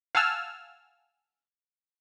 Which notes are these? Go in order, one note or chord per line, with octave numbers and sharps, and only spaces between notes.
F5 F#5 G#5 A5 E6 F6